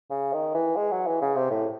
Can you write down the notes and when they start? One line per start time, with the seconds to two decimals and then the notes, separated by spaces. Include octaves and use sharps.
0.10 C#3
0.33 D#3
0.54 E3
0.76 G#3
0.92 F#3
1.07 E3
1.21 C#3
1.35 C3
1.51 A2